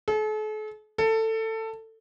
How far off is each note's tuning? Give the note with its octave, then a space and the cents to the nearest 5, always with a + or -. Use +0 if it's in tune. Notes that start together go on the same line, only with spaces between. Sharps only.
A4 -45
A4 +15